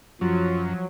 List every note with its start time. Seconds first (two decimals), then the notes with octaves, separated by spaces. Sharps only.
0.21 F#2 F3 F#3 C#4 F4